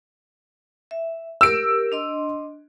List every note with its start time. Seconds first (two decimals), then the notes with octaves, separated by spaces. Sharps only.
0.91 E5
1.41 G4 A#4 E6 D7
1.92 D4 D#5 C6